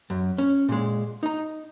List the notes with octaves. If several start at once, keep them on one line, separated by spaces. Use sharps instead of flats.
F#2
C#4
A#2 G#3
D#4 A#5